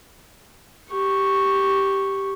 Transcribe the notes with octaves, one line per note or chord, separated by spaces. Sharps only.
G4 C#6